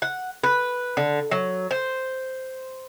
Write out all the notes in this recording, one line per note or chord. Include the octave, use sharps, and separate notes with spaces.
F#5
B4
D3
F#3
C5